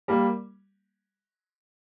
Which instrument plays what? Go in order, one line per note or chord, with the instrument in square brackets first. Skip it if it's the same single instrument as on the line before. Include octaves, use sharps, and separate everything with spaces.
[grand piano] G3 A#3